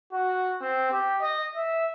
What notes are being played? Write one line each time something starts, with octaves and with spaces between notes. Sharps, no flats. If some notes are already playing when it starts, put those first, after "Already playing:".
F#4
C4
G4
D#5
E5